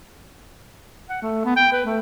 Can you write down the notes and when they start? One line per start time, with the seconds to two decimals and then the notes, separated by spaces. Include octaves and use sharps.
1.10 F#5
1.22 A3
1.45 B3
1.56 G5
1.73 B4
1.86 A3